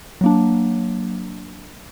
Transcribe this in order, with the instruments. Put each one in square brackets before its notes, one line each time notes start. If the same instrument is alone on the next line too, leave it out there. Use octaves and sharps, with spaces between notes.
[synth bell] F#3 A#3 D4